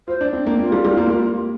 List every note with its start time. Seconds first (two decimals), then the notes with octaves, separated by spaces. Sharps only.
0.08 F4 C5
0.21 D4
0.33 C4
0.47 A#3
0.59 A#3 F4
0.72 G3
0.85 G3
0.97 A#3
1.10 A#3